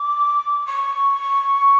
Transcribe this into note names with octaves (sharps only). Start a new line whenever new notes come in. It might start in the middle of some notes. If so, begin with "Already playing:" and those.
Already playing: D6
C#6